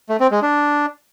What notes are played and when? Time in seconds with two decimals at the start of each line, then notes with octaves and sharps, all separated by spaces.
0.09 A3
0.20 C4
0.31 G#3
0.42 D4